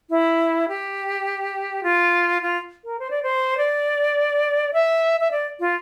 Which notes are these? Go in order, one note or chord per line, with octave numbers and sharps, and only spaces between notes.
E4
G4
F4
F4
A#4
C5
D5
C5
D5
E5
E5
D5
F4